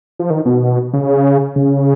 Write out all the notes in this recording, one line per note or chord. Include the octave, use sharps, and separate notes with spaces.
F3
D#3
B2
C#3
C#3